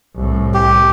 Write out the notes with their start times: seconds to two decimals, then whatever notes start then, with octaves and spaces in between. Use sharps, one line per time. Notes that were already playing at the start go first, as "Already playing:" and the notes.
0.16 C2 A2
0.54 G4